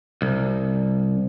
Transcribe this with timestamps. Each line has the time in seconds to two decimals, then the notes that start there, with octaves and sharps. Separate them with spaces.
0.22 C2